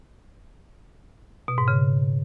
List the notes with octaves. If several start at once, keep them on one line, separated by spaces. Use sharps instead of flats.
B2
G#2
C#3